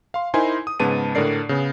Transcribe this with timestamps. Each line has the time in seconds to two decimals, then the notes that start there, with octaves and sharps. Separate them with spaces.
0.14 F5 C6
0.34 D#4 E4 A#4 C5 G#5 C6
0.67 D#6
0.80 G#2 C#3 B3 B4 A5 D#7
1.15 A2 D3 D4 A#4 D5 C7
1.49 C#3 B3